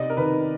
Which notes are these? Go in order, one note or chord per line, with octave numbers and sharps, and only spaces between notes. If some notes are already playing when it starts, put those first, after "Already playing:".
Already playing: C3 D5 D#5
A#4
D#3 B4